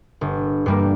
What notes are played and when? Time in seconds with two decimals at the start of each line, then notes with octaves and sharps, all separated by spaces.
0.21 G1
0.66 G2 G3 A#3